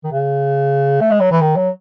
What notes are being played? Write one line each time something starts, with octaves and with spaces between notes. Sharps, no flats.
D#3
C#3
A3
G#3
F#3
E3
D#3
F#3